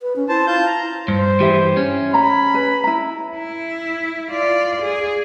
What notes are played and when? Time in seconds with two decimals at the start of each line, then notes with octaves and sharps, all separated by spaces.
0.02 B4
0.16 C#4
0.29 E4 C5 A5
0.47 F4 A5 G6
0.66 A#5
1.08 G2 C5
1.40 G2 E3 G4 E5
1.77 C#4
2.14 A#5 B5
2.54 B4
2.84 E4 A#5
3.38 E4
4.31 F4 D5
4.82 G#4